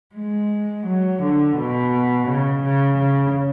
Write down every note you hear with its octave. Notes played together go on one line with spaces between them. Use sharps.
G#3
F#3
D3
B2
C#3
C#3
C#3